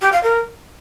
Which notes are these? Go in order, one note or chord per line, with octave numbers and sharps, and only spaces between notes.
G4
F5
A#4